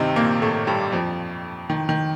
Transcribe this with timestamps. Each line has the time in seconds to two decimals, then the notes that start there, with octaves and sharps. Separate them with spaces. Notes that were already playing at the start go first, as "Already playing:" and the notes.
Already playing: G2 C3 D#3 C4 D#4
0.16 A#2 A#3
0.42 A2 A3
0.67 G2 G3
0.92 F2 F3
1.70 D#3
1.89 D#3